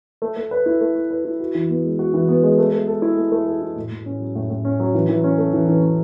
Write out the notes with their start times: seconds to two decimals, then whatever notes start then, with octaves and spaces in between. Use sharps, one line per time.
0.22 A3
0.37 A3
0.51 B4
0.66 E4
0.81 A3
0.95 A3
1.10 B4
1.25 E4
1.40 F#4
1.55 E3
1.69 B3
1.84 G#3
1.99 F#4
2.14 E3
2.29 B3
2.43 G#3
2.58 A3
2.73 A3
2.87 A4
3.02 E4
3.17 A3
3.32 A3
3.46 A4
3.62 E4
3.76 A2
3.91 A2
4.06 C#4
4.20 F#3
4.35 A2
4.50 A2
4.65 C#4
4.80 F#3
4.95 E3
5.09 E3
5.24 C#4
5.38 A3
5.53 E3
5.69 E3
5.83 C#4